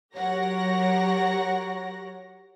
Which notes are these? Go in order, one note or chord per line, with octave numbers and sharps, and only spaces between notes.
F#3 G4 A#4 C#5 F#5 A#6